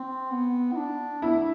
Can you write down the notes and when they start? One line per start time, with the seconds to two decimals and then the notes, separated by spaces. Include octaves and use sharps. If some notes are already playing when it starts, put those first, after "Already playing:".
Already playing: C4
0.31 B3
0.72 E4
0.77 D4
1.22 B3 E4
1.34 A3